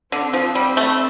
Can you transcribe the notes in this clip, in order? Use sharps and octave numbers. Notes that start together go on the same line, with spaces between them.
D3 C4
F3
G3
A3